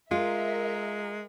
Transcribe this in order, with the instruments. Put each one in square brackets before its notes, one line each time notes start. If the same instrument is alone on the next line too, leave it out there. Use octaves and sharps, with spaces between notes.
[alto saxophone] G#3 [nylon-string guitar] F4 [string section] A#4 E5